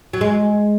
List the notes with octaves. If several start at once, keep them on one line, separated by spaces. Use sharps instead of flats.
F#3
G#3